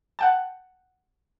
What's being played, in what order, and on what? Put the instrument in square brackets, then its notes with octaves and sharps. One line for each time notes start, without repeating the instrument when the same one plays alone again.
[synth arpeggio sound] F#5 G5 A5